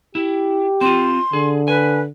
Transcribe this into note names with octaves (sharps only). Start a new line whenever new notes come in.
E4 G4
C4 F4 C6
D3 G#4
B4 G#5